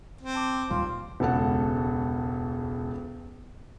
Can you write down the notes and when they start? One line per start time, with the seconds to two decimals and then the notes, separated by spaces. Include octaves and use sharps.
0.21 C4
0.35 A5 D6
0.70 D#2 A#2 G3 F4
1.20 E1 C#2 A4 F#5